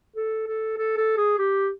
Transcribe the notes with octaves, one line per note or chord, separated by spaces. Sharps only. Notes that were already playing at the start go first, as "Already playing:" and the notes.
A4
A4
A4
A4
G#4
G4